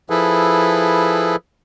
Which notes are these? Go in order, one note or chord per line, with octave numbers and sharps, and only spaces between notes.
F3 E4 G#4 A4 B4